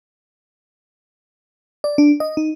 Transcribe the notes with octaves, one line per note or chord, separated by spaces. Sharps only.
D5
D4
D#5
D#4